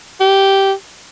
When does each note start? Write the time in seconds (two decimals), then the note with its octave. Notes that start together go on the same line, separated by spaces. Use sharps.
0.20 G4